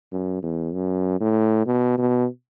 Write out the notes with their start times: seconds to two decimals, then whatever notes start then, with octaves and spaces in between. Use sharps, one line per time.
0.12 F#2
0.43 E2
0.74 F#2
1.20 A2
1.66 B2
1.98 B2